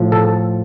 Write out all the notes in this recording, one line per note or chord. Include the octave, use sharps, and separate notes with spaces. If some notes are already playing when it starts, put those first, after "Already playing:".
Already playing: A2 F3
A4